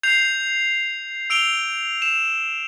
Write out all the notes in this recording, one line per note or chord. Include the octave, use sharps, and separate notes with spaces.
G6 C7 F7
E6 D7 F7 G7
E7